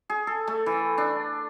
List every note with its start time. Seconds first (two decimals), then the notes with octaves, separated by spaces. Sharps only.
0.10 G#4
0.27 A4
0.48 A3
0.66 E3
0.98 D4